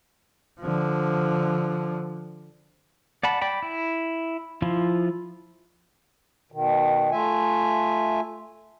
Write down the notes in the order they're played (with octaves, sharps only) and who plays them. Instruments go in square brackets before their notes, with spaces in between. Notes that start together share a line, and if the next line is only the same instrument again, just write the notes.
[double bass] D3 F3
[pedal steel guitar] D5 F#5 A5 B5
D5 G5 B5
E4
F3 E4 F4
[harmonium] B2 D#3
A3 F4 E5 G#5